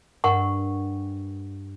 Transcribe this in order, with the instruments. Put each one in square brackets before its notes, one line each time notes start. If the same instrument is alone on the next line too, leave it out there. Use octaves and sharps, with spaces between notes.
[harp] G2 [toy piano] A#4 F#5 C#6